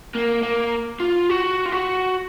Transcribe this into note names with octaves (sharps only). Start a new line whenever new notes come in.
A#3
A#3
F4
F#4
F4
F#4